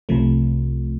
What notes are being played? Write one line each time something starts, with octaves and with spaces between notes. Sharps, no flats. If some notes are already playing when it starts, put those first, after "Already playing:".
C2 C3 F3 A3